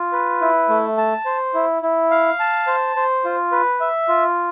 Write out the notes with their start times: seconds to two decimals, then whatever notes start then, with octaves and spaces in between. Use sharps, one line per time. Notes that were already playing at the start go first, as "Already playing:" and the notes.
Already playing: F4
0.12 B4
0.41 E4
0.69 A3
0.97 A5
1.25 C5
1.54 E4
1.82 E4
2.11 F5
2.40 A5
2.67 C5
2.96 C5
3.25 F4
3.52 B4
3.80 E5
4.08 F4